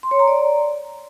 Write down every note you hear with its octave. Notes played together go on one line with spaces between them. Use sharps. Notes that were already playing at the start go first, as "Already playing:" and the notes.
C6
C#5
A#5
D5